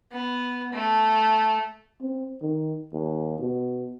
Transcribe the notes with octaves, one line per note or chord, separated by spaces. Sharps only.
B3
A3
C4
D#3
D#2
B2